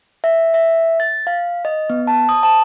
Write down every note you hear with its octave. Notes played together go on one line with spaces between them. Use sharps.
E5
E5
A6
F5
D#5
B3
A5
D#6
A5